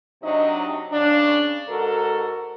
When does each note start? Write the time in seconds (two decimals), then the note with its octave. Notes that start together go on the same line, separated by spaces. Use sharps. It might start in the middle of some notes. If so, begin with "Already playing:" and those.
0.23 C3 F#3 D4 D#4 D#5
0.92 C#3 D4
1.68 G#2 F#4 A4 A#4